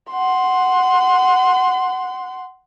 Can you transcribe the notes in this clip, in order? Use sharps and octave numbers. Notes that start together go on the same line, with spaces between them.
F#5 C6